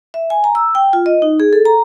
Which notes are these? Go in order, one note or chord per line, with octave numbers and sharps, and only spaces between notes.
E5
G#5
A#5
E6
G5
F4
D#5
D#4
G#4
A4
A#5